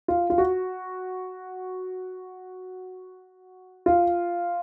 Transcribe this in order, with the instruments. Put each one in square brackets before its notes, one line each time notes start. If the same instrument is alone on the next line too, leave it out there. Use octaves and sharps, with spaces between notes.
[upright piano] F4
F4
F#4
F4